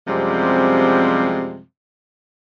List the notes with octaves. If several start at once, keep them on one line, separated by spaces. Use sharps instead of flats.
F#2 C3 F3 G3 G#3 C4